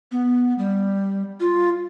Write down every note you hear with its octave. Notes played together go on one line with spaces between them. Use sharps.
B3
G3
F4